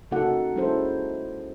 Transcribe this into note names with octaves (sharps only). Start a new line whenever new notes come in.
C#3 A#3 D#4 F#4 A4 F#5
G#3 C#4 E4 A4 C5